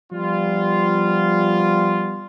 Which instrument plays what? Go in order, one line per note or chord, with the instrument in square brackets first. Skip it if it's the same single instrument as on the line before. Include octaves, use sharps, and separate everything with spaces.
[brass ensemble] F3 G3 B3 F4